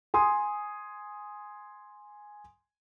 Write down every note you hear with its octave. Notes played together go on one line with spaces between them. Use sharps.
G#5 C6 D#6